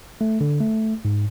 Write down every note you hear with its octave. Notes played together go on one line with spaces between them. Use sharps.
A3
D3
A3
G#2